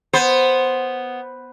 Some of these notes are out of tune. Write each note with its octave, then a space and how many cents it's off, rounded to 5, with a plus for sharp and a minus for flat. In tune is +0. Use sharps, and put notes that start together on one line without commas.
B3 +0 C5 +0